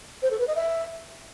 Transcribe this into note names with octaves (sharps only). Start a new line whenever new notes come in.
C5
A4
B4
D#5
E5